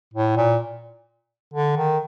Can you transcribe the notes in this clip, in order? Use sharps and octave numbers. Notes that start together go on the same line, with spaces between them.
A2
A#2
D3
D#3